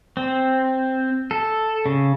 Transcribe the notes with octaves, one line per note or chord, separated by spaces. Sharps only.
C4
A4
C#3